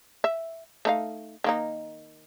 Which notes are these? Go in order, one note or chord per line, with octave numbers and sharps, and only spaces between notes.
E5
A3 D#4 F5
D#3 A#3 D#4